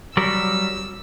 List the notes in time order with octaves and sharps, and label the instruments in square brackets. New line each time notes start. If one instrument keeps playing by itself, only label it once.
[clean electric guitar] F#3 G3 A#4 [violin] E6